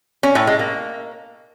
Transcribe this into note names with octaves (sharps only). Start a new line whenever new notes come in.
C#4
A2
G#3
A#3